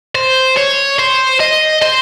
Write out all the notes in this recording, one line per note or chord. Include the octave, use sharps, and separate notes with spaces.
C5
C#5
C5
D#5
C5